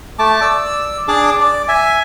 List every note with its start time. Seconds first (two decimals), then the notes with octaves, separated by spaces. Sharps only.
0.19 A3 A5 D6
0.42 D5 E6
1.08 D4 G#4 D5 D6
1.40 D5
1.68 E5 G#5